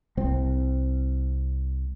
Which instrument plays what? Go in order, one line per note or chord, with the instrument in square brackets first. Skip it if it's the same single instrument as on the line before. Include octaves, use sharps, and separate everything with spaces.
[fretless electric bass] C2 C4